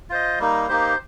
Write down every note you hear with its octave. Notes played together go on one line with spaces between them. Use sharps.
F4 C5 D#5
G3 A#3 D#4
A#3 D#4 G4 C5